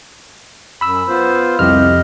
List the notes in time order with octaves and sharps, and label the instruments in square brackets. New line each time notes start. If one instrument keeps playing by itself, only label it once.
[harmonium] F#2 [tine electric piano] B5 E6
[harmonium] B3 F4 C5
[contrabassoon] C2 [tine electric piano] F2 F6 [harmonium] G4 D#5